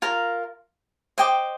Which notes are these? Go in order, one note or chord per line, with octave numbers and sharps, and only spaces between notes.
F4 A#4 F5 A#5
C5 D#5 G5 D6